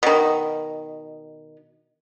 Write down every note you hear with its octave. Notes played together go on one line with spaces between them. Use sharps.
B2 D#3